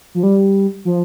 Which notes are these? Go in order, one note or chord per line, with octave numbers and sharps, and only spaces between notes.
F3
G3
F3